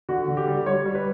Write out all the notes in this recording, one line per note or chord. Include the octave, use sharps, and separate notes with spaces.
D3 F#4
D3
G4
G3
G3 C#5
G3
B4